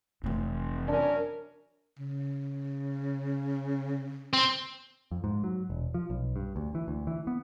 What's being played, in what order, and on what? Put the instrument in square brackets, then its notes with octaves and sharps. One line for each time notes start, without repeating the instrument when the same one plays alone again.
[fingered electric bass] F1 C3 [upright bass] E3 A3
[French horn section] F#2 C#4 A#4 [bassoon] D4
[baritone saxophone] C#3
[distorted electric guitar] C4
[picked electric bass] F2
G#2
F#3
E1
F3
B1
G2
D2
E3
D2
E3
B3